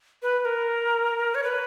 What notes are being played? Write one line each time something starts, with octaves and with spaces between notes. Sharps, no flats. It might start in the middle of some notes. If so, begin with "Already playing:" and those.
B4
B4
A#4
C#5
B4